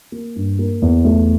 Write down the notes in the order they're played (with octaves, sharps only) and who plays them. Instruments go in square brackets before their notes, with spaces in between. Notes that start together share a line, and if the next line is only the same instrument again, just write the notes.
[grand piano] A#3
G2
A#3
E2
A3